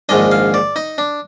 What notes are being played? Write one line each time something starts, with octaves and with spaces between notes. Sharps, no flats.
A#1 G#2 D#3 G#3 D4 D#5
F5
D5
D#4
D4